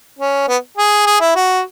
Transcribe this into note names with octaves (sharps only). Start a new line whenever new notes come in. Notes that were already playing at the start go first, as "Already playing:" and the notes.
C#4
B3
G#4
G#4
E4
F#4